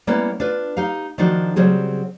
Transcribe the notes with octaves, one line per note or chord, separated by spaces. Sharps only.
G3 A#3 B3 C#4 E4 B4
D4 F4 B4
D#4 G4 F5
D#3 F3 D4 D#4 F#4 A#4
C#3 F#3 G3 C4 G#4